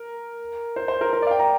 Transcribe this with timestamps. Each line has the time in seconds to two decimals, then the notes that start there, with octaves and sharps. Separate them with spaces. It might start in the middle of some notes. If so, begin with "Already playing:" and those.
Already playing: A#4
0.76 C5
0.88 C5
1.01 A#4
1.13 A#4
1.22 D5
1.27 F5
1.31 G5
1.39 A#5